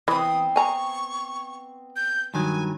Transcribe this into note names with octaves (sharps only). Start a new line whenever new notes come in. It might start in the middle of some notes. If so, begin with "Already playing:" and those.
E3 B3 C4 D#6
G#5 A#5 C#6
G6
G2 D#3 F#3 G#5